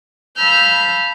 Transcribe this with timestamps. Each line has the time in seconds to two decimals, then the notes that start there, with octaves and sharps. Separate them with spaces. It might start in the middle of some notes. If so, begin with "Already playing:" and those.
0.36 F5 A5 B5 E6 F6 G6